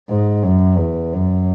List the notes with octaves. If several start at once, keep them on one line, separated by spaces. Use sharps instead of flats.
G#2
F#2
E2
F#2